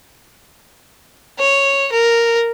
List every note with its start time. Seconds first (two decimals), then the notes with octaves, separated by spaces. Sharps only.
1.38 C#5
1.92 A#4